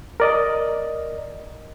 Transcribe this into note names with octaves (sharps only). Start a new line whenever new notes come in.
A#4 D5 D#5